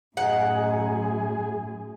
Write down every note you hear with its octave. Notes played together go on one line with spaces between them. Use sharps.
F#2 A2 D#4 G#4 F#5